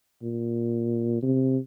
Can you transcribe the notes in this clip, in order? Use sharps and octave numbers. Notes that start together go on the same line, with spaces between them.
A#2
C3